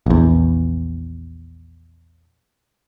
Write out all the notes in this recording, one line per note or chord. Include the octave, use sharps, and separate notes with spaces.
A#1 E2